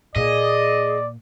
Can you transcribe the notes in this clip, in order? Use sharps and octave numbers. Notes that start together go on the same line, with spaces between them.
A#2 G#4 D5 D#5